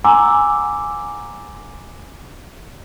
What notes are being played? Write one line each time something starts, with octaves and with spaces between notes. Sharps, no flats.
F#5 G#5 A#5 C6 D6 E6